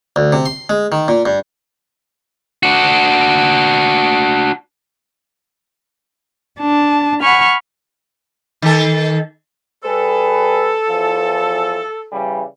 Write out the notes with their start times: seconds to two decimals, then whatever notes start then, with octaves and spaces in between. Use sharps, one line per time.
0.16 D2
0.33 C3
0.46 C6
0.70 G#3
0.92 D#3
1.08 A#2
1.26 G2
2.63 D4 F#4
6.59 D4 A5
7.20 F#5 G#5 B5 C#6 F6
8.62 D#3 A4
9.83 G3 G#4 A4 B4
10.86 E2 E3 F3
12.11 C#3 E3 G3